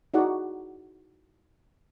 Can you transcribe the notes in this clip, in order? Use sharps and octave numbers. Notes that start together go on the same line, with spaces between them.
D#4 E4 F#4 G#4 D5 F#5